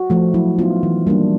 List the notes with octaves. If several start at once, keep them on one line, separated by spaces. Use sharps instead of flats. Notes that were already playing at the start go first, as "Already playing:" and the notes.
Already playing: F#4
F3 A3
F#3 E4
B3 D#4 F4
E3
G3 A#3 D4